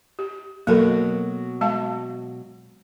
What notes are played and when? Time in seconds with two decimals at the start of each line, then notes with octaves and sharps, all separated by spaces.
0.19 G4
0.67 B2 F#3 A#3 A4 A#4
1.61 G#3 F5 A5